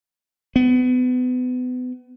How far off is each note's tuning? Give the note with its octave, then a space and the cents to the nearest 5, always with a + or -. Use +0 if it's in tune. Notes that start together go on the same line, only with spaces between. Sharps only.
B3 +30